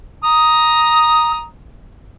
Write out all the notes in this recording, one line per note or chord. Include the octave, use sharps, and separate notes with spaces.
A#5 D#6